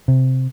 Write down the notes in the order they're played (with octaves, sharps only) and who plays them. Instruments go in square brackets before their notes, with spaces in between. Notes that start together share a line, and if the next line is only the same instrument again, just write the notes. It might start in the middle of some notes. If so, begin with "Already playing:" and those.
[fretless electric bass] C3